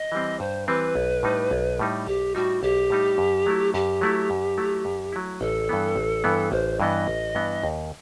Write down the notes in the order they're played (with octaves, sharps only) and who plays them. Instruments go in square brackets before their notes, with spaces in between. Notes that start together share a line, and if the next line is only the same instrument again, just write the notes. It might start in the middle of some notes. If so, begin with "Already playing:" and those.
Already playing: [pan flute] D#5
[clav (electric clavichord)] E3 G3 C4
[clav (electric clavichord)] G2 [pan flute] C5
[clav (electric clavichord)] E3 G3 C4 [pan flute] B4
[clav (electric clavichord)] B1
A2 G3 D#4
B1
A2 G3 D#4
[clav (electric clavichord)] B1 [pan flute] G4
[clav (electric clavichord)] A2 G3 D#4 [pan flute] F#4
[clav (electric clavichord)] B1 [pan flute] G4
[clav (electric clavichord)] A2 G3 D#4
F#2
F#3 A3 E4
[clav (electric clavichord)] F#2 [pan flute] G4
[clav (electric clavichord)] F#3 A3 E4
F#2
F#3 A3 E4
F#2
F#3 A3 E4
[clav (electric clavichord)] A1 [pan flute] A4
[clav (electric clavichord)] G2 E3 B3
A1
G2 E3 B3
[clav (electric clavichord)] A1 [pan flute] C5
[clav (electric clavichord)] G2 E3 B3 [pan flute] D#5
[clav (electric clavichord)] A1
G2 E3 B3
D#2